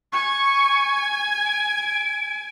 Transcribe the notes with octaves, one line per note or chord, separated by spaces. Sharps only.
G#5 C#6
D7